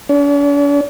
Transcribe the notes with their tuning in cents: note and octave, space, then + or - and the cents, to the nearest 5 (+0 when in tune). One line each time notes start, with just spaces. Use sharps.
D4 -45